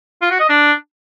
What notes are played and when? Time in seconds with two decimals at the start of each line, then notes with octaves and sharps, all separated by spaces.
0.22 F4
0.31 F#4
0.40 D#5
0.49 D4